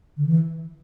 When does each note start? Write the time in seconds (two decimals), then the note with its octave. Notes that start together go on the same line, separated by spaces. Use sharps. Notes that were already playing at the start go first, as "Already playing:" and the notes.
0.17 D3
0.27 E3